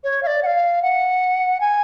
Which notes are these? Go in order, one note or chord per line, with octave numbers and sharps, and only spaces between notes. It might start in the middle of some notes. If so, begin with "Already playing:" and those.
C#5
F5
D5
F#5
F5
F#5
G#5